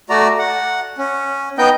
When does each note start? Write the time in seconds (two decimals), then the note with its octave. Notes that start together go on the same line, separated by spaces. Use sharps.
0.10 A3 F#4 D5 A#5
0.39 F#5
0.98 C#4
1.58 B3 D#4 D#5 G5 G6